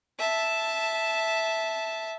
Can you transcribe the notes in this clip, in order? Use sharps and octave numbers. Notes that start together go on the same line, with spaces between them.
E5 A5